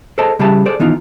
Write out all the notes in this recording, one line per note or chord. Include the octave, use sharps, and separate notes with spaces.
G#4 A4 C5 C#5 D#5 A5
C#3 G3 G4 G#4 E5 A5
G#4 A4 C5 D5
D#3 E3 B3 D#4 F4